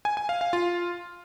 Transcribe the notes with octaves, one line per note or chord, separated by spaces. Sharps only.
G#5
G#5
F5
F5
F4